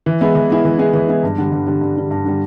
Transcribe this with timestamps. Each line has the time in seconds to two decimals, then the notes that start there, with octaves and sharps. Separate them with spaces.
0.06 E3
0.21 G#3 B3 E4 G#4
0.35 E3
0.50 G#3 B3 E4 G#4
0.65 E3
0.79 G#3 B3 E4 G#4
0.93 E3
1.08 G#3 B3 E4 G#4
1.23 G2
1.38 D3 G3
1.52 G2
1.67 D3 G3
1.81 G2
1.96 D3 G3
2.11 G2
2.25 D3 G3